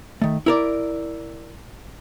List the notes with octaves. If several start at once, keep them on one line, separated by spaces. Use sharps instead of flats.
D#3 A3
E4 A#4 D5